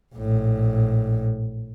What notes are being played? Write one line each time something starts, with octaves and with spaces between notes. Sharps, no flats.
A#1 A2